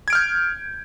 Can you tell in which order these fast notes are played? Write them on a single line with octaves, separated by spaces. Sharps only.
G#6 D7 F6 G6